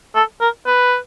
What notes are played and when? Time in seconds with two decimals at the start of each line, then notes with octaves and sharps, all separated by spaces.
0.16 A4
0.41 A#4
0.66 B4